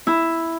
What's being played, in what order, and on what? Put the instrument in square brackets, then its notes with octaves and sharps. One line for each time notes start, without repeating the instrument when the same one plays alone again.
[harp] E4